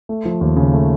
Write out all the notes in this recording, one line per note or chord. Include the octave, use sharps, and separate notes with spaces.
A3
F3
D#2
C#3
A3